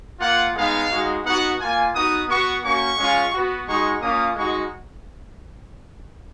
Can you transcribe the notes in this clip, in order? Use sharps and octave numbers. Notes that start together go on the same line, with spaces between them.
A#3 F4 F#5
G#3 B3 D#4 F5
G#3 D#4 F#4
B3 D#4 F#4 F#5
A#3 F4 G#5
B3 D#4 F#4 D#6
B3 F#4 C#6
A#3 C#4 F#4 C#6
G#3 C#4 F4
B3 F#4
G#3 D#4 F#4 C#6
A#3 C#4 F4 D#6
G#3 D#4 F#4 C#6